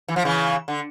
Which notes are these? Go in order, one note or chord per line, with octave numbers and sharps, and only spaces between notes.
E3
F3
C#3 E3
D3